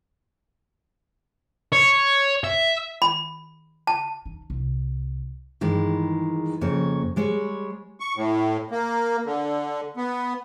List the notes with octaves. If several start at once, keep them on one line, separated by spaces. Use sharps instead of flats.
C#5
E5
B5
A5
D#3
C2
G2 D#3 E3 G#3
F2 C#3 A#3 C#5
G3 G#3 C#5
C#6
A2
A#3
D3
B3